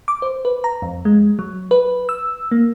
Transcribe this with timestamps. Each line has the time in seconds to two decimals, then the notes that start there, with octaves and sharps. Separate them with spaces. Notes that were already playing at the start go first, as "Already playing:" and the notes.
0.08 D6
0.22 C5
0.45 B4
0.64 A#5
0.82 F2
1.05 G#3
1.39 F#3
1.71 B4
2.09 E6
2.51 A#3